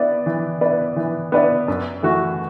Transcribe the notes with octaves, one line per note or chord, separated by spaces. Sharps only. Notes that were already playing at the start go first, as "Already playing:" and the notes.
Already playing: B3 E4 B4 D5
E3
B3 E4 B4 D5
E3
B3 E4 B4 D5
F#2
E3 A3 F#4